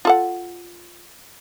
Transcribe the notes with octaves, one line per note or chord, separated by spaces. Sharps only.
F4 A4 F#5